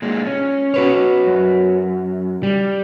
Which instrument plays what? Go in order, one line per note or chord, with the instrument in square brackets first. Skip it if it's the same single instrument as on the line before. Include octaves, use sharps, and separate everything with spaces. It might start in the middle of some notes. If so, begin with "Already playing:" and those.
[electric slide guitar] A#2 G#3
C#4
[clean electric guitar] F#4 B4 C#5
[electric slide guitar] F#2
[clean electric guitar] G3